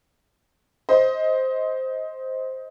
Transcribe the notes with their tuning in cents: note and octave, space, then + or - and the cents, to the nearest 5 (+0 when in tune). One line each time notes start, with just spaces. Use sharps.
C5 +0 D#5 +20